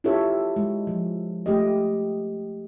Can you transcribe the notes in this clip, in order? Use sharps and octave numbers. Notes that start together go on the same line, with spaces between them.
E4 F4 G4 A4 C#5 E5
G#3
F3
A3 G4 D#5